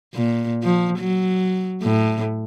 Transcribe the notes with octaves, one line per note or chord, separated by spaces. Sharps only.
A#2
F3
F#3
A2